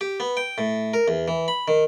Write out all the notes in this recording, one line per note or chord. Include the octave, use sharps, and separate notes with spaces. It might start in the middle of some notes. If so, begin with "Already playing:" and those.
G4
B3
G5
A2
A#4
E2
E3
B5
D#3